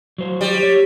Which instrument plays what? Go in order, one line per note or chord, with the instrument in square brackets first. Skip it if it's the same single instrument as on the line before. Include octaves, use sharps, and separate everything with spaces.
[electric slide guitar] F#3 C5
[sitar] G3
[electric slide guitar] C#5